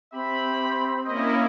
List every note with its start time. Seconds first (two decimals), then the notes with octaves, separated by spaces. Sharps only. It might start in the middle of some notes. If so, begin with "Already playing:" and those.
0.13 C4 G4 E5 B5
1.06 A#3 C#4 E4 D#5